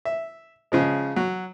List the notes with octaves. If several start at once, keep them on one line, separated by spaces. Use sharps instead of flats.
E5
C#3 F3 G#3
F#3